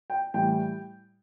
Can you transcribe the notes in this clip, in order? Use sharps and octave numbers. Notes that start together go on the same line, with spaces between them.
G5
A2 E3 G3 G5